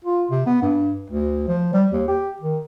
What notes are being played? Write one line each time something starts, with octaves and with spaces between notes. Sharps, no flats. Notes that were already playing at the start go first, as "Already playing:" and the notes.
F4
C3
B3
G2
D2
F3
G3
D#2
G4
D#3